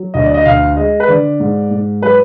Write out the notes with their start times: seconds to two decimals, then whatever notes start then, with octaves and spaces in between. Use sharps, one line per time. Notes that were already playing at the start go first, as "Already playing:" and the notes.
Already playing: F#3
0.14 D2 D#5
0.24 D5
0.34 D#5
0.45 D2 F5
0.77 G#3 D#5
1.00 B4
1.08 D3 D5
1.40 G#2
1.71 G#2
2.02 F#3 B4